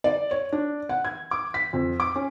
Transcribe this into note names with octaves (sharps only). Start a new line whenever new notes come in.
D5
C#5
D4
F#5
G#6
D6
B6
F2
D6
C#4